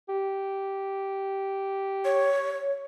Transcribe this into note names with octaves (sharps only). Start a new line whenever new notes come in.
G4
C#5